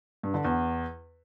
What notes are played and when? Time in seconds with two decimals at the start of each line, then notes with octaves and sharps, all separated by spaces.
0.23 G2
0.34 D3
0.45 E2